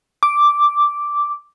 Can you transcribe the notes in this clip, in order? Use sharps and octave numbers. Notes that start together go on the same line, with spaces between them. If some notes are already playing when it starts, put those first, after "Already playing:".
D6